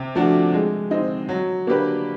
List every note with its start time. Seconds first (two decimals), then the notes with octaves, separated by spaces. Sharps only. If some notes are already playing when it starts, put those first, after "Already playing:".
Already playing: C3
0.15 F3 A3 D4 F#4
0.54 G#3
0.91 C4 D#4
1.29 F#3
1.67 A#3 D4 G4 B4